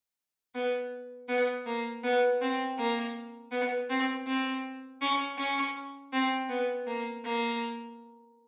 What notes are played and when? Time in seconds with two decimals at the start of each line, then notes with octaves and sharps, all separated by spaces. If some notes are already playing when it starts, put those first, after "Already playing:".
0.55 B3
1.28 B3
1.66 A#3
2.04 B3
2.41 C4
2.78 A#3
3.51 B3
3.90 C4
4.26 C4
5.01 C#4
5.38 C#4
6.13 C4
6.49 B3
6.87 A#3
7.24 A#3